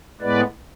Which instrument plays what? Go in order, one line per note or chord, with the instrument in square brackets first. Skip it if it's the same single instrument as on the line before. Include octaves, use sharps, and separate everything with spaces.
[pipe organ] A2 G#3 B3 B4 D5